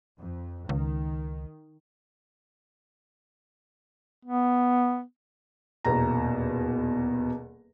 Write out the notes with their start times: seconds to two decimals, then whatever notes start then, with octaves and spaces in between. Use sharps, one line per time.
0.19 F2
0.69 C#2 D#3
4.25 B3
5.85 D#1 E2 B2 A#5